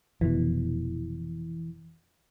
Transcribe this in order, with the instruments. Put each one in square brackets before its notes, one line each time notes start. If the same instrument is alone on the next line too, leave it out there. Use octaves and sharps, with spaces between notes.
[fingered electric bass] F1 B2 [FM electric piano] E3